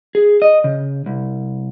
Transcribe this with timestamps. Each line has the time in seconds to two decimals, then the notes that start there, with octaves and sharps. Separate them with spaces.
0.15 G#4
0.42 D#5
0.64 C#3
1.06 C2